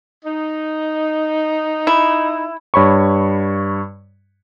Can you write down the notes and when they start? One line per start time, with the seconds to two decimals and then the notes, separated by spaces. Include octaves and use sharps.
0.24 D#4
1.87 E4
2.74 G2 C#5 B5 C#6